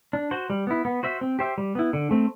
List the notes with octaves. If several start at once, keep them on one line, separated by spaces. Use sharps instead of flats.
D4
F#4 C5
G3
B3 E4
B3
F#4 C5 E5
C4
G4 C5 E5
G3
B3 E4
D3
A3 C4